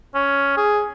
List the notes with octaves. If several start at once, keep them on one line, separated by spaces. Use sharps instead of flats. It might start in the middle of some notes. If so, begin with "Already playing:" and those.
C#4
G#4